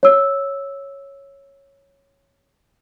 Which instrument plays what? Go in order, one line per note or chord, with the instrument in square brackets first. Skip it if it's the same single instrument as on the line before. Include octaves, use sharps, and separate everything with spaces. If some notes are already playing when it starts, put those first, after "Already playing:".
[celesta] C#5 E6